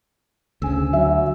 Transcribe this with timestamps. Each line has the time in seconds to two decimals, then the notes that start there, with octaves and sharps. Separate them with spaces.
0.62 D2 C#3 G#5 E6
0.93 F#3 E5